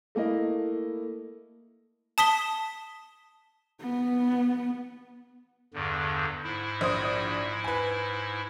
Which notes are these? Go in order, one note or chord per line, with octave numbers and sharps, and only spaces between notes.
A3 A#3 E4 D#5
A5 D#6 B6 G7
B3
E2 G2 D3
G#2 E4
A#1 C5 D#6
B4 G#5